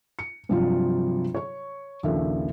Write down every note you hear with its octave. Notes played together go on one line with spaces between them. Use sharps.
C#7
G2 C3 F3 F#3 F4
C#5 C#6
A#1 D#2 C#3 A4 E5